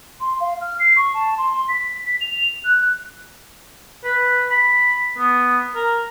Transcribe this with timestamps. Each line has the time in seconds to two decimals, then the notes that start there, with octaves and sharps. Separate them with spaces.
0.20 C6
0.40 F5
0.61 F6
0.79 C7
0.96 C#6
1.14 A5
1.38 C6
1.68 B6
2.21 F7
2.64 F#6
4.04 B4
4.50 B5
5.18 B3
5.75 A#4